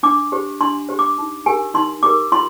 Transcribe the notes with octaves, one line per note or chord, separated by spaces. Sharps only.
D4 D6
G4 C5
D4 C6
G4 C5
D6
D#4
G4 A#4 G#5
D#4 C6
G4 A#4 D6
F4 C6